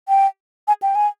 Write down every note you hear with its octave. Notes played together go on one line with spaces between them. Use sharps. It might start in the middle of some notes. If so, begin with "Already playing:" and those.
G5
G#5
G5
G#5